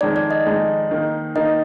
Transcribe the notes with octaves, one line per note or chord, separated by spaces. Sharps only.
F2 D#3 G#3 D#4 D5
D5
D#5
F2 D#3 G#3 D#4
D#3 A#3 D#4
D#3 A#3 D#4 D#5